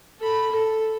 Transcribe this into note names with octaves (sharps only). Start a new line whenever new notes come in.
A4 B5
A4